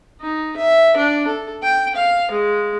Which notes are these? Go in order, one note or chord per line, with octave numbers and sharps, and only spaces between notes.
D#4
E5
D4
A4
G5
F5
G#3